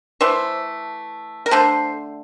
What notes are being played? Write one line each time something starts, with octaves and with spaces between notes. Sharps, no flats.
E3 A3 C5 E5
A#4
D3 A3 A4 C5